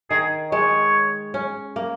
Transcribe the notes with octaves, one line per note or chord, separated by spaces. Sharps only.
D#3 G#4
G#3 C#5
C#4
A#3